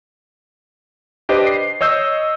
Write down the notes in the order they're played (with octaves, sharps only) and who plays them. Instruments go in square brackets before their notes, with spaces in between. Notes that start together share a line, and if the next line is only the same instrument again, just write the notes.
[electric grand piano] D4 G4 B4 C5 D#5
C7
C#5 D#5 E6 G6